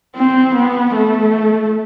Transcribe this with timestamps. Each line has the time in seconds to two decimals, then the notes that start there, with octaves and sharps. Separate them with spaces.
0.16 C4
0.55 B3
0.96 A3